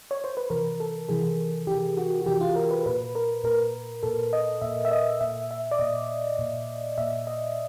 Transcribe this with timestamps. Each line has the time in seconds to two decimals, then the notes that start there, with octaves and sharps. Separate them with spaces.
0.11 C#5
0.24 C5
0.37 B4
0.50 C3 E3 A#4
0.80 A4
1.09 C3 E3 G#4
1.67 C3 E3 G4
1.97 F#4
2.21 F#4
2.26 C3 E3 G4
2.41 F4
2.56 A#4
2.71 B4
2.86 A#2 B4
3.15 A#4
3.44 A#2 A#4
4.03 A#2 A4
4.33 D#5
4.61 A#2 E5
4.85 E5
4.91 D#5
5.21 A#2 E5
5.51 E5
5.71 D5
5.79 A#2 D#5
6.39 A#2
6.98 A#2 E5
7.27 D#5